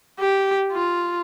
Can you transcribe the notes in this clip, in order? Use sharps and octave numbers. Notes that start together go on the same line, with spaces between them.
G4
F4